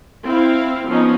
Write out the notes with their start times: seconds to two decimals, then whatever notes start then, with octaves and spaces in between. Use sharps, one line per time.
0.25 C4 E4 F5
0.87 F3 B3 C#4 D#4